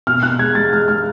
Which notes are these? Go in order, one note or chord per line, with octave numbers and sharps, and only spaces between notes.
B2 F6
B2 F#6
G#3 G#6
G#3 A6
G#3 F6
G#3 F6